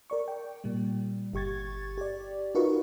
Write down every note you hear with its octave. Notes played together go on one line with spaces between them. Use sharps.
A#4 D5 C#6
G5
A#2 G3
G1 G4 C#6 G#6 A6
G4 D5
D#4 F4 F#4 A#4 B4 C#6